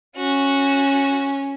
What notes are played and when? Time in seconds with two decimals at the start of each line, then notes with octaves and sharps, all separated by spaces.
0.17 C#4 F#4